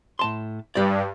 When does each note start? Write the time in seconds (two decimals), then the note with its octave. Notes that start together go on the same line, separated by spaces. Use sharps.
0.19 A2 A5 C6
0.75 G2 G4 D5